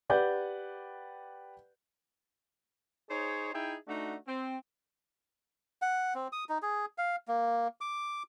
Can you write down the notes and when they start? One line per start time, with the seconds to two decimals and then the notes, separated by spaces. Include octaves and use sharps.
0.10 G4 B4 D5 F#5 G6
3.10 D#4 G#4 C5 C#5
3.54 D#4 E4 G#4 E5 G5
3.88 A3 D4 D#4 F#4
4.28 C4
5.82 F#5
6.15 C4
6.32 D#6
6.49 D#4
6.62 G#4
6.98 F5
7.28 A#3
7.81 D6